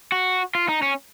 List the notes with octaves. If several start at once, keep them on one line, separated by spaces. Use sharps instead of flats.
F#4
F4
D#4
C#4